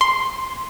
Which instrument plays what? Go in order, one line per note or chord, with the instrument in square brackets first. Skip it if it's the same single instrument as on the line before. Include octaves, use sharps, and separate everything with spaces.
[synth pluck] C6